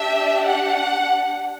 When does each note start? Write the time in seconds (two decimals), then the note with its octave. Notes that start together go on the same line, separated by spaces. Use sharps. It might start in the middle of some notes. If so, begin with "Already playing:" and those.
Already playing: D4 G4 E5
0.45 F#5